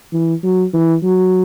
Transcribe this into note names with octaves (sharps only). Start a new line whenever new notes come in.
E3
F#3
E3
F#3